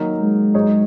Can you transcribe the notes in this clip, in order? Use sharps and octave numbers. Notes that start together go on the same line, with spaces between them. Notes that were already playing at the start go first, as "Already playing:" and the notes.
Already playing: D#3 F#3 A#3 D#4 A#4
G#3
G#2 F#3 D#4 G#4 C#5